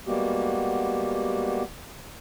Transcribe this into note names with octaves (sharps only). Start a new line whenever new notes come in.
G3 G#3 A#3 B3 F#4 G4